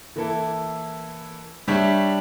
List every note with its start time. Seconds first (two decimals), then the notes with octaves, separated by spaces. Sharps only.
0.16 E3 A#3 E4 A4
1.67 G3 D4 G4 C#5 E5